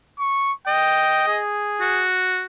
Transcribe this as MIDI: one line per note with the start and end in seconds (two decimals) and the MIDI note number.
0.19 0.52 85
0.67 1.37 75
0.67 1.26 79
1.28 2.08 68
1.81 2.44 66